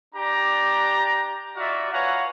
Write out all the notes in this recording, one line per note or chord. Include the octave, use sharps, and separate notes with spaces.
D4 G4 D5 A#5
D#4 F4 F#4 D5 E5 F5
B4 C#5 F5 F#5 G#5 A#5